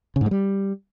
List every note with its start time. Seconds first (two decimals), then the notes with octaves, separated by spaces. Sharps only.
0.16 C#3
0.21 G#2
0.26 G#3
0.31 G3